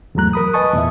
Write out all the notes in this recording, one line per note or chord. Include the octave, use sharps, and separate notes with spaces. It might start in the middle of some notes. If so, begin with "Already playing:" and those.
E2 G#2 F#3 A3 A#5 F#6
A#4 B5 D#6
B4 D#5 G#5 A5 C#6 D#6
E2 A#2 E5